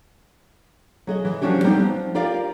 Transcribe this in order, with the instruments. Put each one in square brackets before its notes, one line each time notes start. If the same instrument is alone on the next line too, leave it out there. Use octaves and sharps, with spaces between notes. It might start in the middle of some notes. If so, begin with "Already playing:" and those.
[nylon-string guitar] F#3 G#4 D#5
E3
F3 F#3 C#4 D4 F#4 G4
G3 B3 C4 D#4 G4
F3
F4 G4 A#4 D5 F5